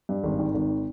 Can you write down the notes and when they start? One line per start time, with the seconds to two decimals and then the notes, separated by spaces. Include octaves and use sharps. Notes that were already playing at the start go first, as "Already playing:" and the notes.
0.09 G2
0.24 G#1
0.39 D#3
0.54 G#1